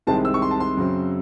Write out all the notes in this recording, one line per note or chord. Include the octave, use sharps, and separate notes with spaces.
C2 C3 D#3 G#3 C4 A5
E6
C#6
C6
A5
C6
F#2 C#3 F#3 C4